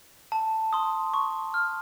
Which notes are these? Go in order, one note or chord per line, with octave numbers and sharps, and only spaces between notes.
A5
C6 D#6
C#6
F6